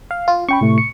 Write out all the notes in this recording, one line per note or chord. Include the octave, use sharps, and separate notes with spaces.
F5
F4
C#4 G5 B5 C#6
A2 C3 A3
C#7